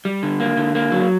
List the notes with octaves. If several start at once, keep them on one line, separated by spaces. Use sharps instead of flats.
G3
D3
A#3
D3
A#3
F#3